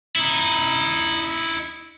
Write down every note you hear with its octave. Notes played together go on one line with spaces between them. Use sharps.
D#4 E4